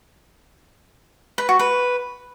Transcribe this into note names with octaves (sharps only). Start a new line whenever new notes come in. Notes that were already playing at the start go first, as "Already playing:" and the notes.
B4
F#4
B4